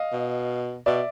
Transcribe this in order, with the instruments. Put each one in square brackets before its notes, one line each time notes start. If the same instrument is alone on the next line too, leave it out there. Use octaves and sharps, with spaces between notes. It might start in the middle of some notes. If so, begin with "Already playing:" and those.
Already playing: [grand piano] D#5 F5
[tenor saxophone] B2
[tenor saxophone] B2 [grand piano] D5 E5